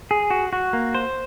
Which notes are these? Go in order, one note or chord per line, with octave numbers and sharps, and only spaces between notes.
G#4
F#4
F#4
A#3
C5